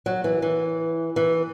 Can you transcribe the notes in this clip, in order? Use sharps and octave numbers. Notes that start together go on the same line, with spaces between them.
F#3
E3
E3
E3